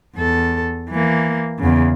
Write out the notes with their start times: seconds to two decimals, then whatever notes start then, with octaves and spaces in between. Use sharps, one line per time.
0.16 E2 A4
0.90 E3 A#3
1.59 E2 C#3